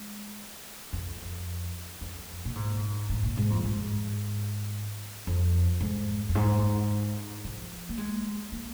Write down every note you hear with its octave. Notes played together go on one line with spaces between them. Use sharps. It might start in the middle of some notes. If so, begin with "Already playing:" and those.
Already playing: G#3
F2
F2
A#2
G#2
G#2
A#2
G#2
F2
G#2
F2
G#2
F2
G#2
F3
A#3
G#3
A#3